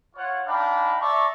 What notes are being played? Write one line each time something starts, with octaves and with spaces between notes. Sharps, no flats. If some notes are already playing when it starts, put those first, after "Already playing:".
F4 C#5 F#5
D4 D#4 F5 G5 A#5 B5
D5 E5 A5 A#5 C#6